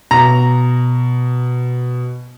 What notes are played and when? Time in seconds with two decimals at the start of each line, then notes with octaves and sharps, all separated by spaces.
0.11 B2 A#5